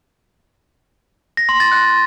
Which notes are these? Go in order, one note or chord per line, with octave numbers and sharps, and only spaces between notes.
A#6
C6
A6
F#6